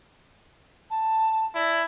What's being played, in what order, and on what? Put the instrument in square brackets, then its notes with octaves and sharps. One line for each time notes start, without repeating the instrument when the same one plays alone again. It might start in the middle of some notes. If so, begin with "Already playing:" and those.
[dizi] A5
[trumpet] E4 [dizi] D5